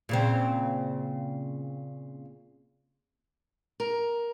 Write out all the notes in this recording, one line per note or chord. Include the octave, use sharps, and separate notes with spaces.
A#2 C#3 C4
A#4